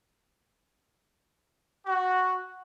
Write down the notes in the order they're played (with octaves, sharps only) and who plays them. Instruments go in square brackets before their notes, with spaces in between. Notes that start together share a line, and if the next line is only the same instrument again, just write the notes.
[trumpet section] F#4